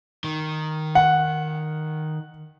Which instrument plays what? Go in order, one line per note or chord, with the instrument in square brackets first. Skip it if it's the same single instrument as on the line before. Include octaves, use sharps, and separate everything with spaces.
[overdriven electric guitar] D#3
[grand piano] F#5